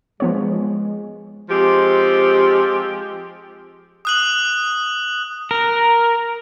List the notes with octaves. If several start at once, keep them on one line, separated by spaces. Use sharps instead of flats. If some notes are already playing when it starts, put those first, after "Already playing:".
F3 G#3 B3 C#5
F3 G#3 C4 G4
D#6 F#6 F#7
A#4